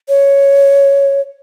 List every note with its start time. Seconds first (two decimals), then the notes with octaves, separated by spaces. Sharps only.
0.09 C#5